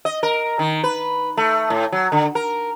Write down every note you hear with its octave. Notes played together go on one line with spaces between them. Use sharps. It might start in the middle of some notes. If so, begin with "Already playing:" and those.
D#5
A#4
D#3
B4
A3
A2
F#3
D3
A#4